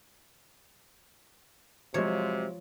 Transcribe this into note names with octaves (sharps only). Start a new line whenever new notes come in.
C3 F3 F#3 G#3 C#5